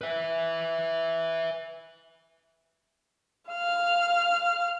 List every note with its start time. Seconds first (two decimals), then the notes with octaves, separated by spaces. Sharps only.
0.01 B4 E5
3.50 F5 F6